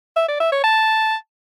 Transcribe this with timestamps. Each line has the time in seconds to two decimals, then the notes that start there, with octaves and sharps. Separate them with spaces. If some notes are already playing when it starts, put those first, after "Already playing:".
0.17 E5
0.28 D5
0.40 E5
0.52 C#5
0.64 A5